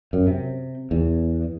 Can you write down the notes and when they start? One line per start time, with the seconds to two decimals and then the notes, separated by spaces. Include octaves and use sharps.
0.13 F#2
0.27 C3
0.91 E2